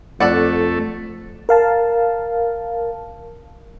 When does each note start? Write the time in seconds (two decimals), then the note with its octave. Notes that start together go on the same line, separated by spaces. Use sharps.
0.20 F2 A3 A4 D5 F#5
1.49 A#4 F5 A5